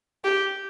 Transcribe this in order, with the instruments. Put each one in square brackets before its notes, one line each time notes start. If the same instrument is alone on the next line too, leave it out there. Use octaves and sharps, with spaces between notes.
[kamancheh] G4